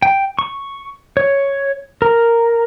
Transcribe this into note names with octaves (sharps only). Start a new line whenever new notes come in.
G5
C#6
C#5
A#4